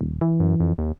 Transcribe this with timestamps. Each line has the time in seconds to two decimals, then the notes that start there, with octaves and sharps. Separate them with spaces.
0.01 D#1
0.21 E3
0.40 F#2
0.60 F2
0.78 D#2